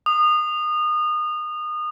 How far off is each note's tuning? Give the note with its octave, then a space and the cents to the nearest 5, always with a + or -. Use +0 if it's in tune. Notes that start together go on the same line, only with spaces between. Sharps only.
D#6 -30